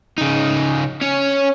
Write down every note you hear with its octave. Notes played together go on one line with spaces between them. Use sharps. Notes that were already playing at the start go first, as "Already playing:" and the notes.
C#3 D#4
C#4 C#5